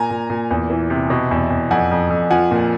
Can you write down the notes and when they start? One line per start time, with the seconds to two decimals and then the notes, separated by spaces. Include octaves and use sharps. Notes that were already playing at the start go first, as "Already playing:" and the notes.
Already playing: A#2 G#5 A#5
0.10 A#2
0.30 A#2
0.51 E2
0.70 E3
0.90 C3
1.10 B2
1.31 E2
1.50 E2
1.71 F2 F#5 G#5
1.91 F2
2.10 F2
2.30 F3 F#5 G#5
2.51 A#2